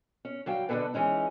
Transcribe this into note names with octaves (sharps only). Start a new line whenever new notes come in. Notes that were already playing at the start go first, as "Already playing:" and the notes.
C#4
G2 F#3 F5 G5
B2 D3 D4 G#4 A4 B4
E3 G#3 C#4 D#4